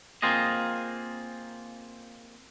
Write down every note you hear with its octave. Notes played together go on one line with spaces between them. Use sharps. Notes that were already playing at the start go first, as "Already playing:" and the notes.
A#3 C4 F4 G#4 D#5